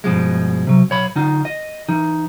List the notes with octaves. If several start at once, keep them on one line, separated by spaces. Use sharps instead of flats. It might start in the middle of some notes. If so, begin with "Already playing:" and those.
G2 B2 F3 G#3
C3 F#3
B1 C#5 B5
D3 D#4 F4
D#5
E3 D#4